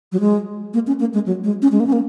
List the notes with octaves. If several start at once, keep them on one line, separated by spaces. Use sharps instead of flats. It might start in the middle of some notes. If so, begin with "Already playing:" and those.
F#3
G#3
A#3
C#4
A#3
G#3
F#3
G#3
C#4
G#3
A#3
C#4
A#3